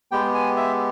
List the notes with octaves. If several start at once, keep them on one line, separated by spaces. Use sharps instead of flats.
G#3 B3 G4 G5
G#5
E5